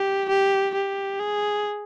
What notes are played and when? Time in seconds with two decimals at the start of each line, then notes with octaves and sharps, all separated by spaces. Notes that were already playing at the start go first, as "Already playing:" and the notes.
Already playing: G4
0.29 G4
0.74 G4
1.20 G#4